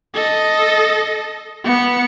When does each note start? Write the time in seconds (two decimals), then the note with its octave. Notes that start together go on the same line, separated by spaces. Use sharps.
0.15 A4 D#5
1.64 B3 C#7